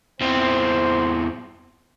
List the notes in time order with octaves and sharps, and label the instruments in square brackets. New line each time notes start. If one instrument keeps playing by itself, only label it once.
[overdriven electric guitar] E2 C4 [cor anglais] C5